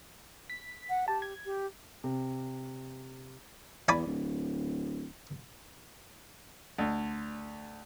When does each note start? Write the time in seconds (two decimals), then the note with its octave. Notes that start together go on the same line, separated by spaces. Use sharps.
0.50 B6
0.89 F#5
1.08 G4 A5
1.22 G#6
1.46 G4
2.04 C3
3.89 E2 D5 G#5 B5
4.07 D1
6.78 D2